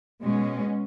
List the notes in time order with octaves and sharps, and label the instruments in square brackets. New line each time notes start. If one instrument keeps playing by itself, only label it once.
[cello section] B2 G#3 C#4